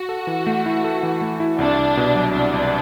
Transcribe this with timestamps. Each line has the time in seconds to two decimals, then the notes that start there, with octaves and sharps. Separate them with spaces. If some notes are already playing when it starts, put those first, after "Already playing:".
Already playing: F#4
0.09 A4
0.27 E3
0.47 A3
0.66 E4
0.84 A4
1.03 E3
1.21 A3
1.40 E4
1.59 C2 D4
1.78 C2
1.97 B2
2.15 F#3
2.34 C2 D4
2.54 C2